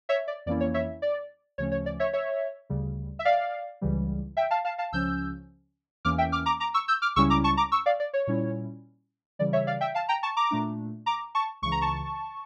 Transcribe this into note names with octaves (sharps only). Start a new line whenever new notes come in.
C#5 E5
D5
F2 E3 A#3 C#4 E4 D5
C#5
C#5 E5
D5
D2 C#3 F3 A3 C#4 C#5
C#5
D5
C#5 E5
C#5 E5
D2 C#3 G3
E5
D5 F5
C#2 C#3 E3 G3
E5 G5
F5 A5
F5 A5
F5 A5
C#2 C#3 F3 C#4 E6 G6
E2 E3 A#3 C#4 D6 F6
E5 G5
D6 F6
A#5 D6
A#5 D6
C#6 E6
E6 G6
D6 F6
C#2 C#3 G3 C#4 E4 C#6 E6
A#5 D6
A5 C#6
A#5 D6
C#6 E6
D5 F5
D5
C#5
A#2 G3 C#4 E4
C#3 E3 G3 D5
C#5 E5
D5 F5
E5 G5
F5 A5
G5 A#5
A5 C#6
A#5 D6
A#2 A3 D4
A#5 D6
A5 C#6
C#2 C#3 E3 C#6
A#5
A5 C#6